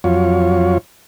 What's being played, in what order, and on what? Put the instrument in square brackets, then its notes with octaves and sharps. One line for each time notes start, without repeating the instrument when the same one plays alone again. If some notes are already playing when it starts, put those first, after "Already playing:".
[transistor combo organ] F2 F#3 F4 C#5